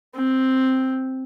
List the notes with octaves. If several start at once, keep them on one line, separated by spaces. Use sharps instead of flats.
C4